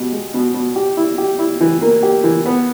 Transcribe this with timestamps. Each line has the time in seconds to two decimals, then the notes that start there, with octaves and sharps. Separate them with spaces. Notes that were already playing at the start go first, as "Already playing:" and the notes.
Already playing: B2 G4
0.12 G#3
0.34 B2
0.54 B2
0.76 G4
0.97 E4
1.18 G4
1.39 E4
1.61 E3
1.81 A#3
2.03 G4
2.24 E3
2.46 B3